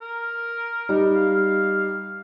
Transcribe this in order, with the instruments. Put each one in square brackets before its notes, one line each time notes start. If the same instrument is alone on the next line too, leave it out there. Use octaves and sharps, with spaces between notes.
[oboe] A#4
[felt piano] G3 D#4
[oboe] F5